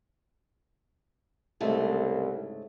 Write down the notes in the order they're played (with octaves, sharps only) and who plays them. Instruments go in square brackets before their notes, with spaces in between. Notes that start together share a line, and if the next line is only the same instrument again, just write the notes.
[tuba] C2 [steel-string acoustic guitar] G#2 C#3 A3